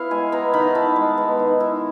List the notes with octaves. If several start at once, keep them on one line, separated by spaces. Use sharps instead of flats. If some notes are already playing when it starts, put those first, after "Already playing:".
Already playing: B3 E4 F5
G#3 G#5
B3 A#5
D#3 B5
E4 A5
G#3
B3
D#3
E4